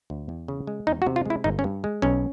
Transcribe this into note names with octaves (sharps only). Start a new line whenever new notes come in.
D2
E2
C#3
G#3
E2 D#4
F#4
C3
F4
G#3 E4
G1 D#4
C#4
G2
G#3
B1 C#4